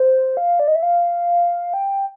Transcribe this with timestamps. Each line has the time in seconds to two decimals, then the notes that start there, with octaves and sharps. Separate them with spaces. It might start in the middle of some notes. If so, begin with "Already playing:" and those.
Already playing: C5
0.37 F5
0.60 D5
0.68 D#5
0.75 E5
0.83 F5
1.74 G5